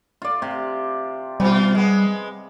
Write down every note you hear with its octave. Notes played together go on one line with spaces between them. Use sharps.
F4 D5
C3 F4
B2 G3 F4 F#5
G#3 B3